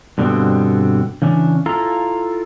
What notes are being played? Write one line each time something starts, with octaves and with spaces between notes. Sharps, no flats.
G2 B2 D3 G3 B3 C4
C#3 E3 C#4 D4
E4 F4 A4 F5 A#5